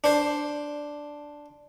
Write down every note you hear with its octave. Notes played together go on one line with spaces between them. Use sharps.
D4 C5